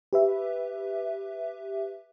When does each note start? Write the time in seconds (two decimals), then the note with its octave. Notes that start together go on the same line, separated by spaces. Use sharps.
0.13 G4 B4 E5